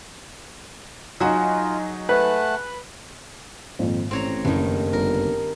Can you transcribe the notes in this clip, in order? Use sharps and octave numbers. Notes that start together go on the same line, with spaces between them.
F#3 D#4 F4 F#4 G#4
A3 B4 F#5 A5
G#1 F2 A#2
A1 C4 C#5 A#5
F#1 G2 D#3 A3
G1 A#4